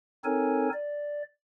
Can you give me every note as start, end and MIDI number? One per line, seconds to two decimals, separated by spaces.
0.24 0.69 60
0.24 0.69 63
0.24 0.69 69
0.24 0.69 70
0.24 0.69 73
0.24 0.69 80
0.73 1.22 74